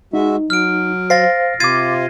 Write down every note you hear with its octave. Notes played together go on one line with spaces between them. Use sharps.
G#3 D#4 F#4 E5
F#3 F6 D7
C5 F5 A6 A#6 C7
C3 F4 D6 G#6 A6 C7 D#7